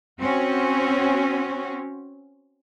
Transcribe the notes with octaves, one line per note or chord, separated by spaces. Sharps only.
C4 C#4 F#4